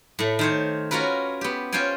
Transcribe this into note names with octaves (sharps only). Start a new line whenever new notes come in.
A2 A3
D#3 C5 C#5
C#4 F4 F#4 A#4 B4
B3 G4
C#4 F4 C5 G5 G#5